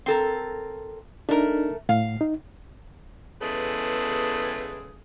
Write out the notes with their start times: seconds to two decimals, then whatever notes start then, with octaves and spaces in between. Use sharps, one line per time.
0.06 C4 A4 A#4
1.29 A3 D4 D#4 A#4
1.89 A2 F5
2.21 D#4
3.41 E2 C#3 G#3 G#4 A4 B4